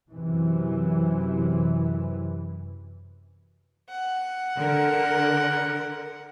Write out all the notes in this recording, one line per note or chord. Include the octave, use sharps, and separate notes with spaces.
F#2 C3 E3
F#5
D3 A#4